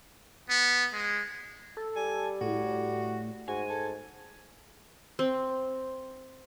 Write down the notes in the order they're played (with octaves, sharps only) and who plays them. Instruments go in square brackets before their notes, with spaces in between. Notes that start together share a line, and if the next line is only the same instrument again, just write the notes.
[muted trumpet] B3
G#3
[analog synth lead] A4
[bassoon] G3 [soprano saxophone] G#5
[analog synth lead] A2 [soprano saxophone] F#4
[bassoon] G#2 [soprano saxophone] F#4 [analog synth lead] G#5
[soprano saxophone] A4
[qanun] C4